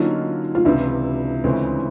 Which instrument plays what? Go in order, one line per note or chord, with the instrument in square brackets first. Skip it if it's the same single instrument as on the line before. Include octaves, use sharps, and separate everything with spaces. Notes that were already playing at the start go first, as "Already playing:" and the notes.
Already playing: [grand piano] D3 F#3 A#3 C#4 [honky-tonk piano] D#4 F4
[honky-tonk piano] F4
[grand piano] C#2 C3 E3 [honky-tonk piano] D4 E4
[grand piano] D2 C#3 E3 G#3 C4